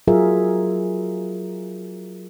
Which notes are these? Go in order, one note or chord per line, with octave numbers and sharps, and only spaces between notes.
F#3 F4 G#4 A#4 E5